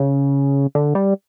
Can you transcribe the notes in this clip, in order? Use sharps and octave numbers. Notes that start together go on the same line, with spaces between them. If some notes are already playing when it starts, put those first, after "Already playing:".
Already playing: C#3
D3
G3